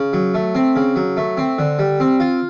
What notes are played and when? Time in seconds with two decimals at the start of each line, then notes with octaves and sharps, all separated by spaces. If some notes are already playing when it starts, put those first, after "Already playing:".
Already playing: C#3
0.13 F#3
0.34 A3
0.55 C4
0.76 C#3
0.96 F#3
1.17 A3
1.37 C4
1.59 D3
1.79 G3
2.00 C4
2.20 F4